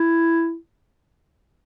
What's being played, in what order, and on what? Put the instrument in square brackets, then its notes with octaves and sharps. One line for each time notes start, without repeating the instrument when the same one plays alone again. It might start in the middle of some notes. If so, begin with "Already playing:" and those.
Already playing: [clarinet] E4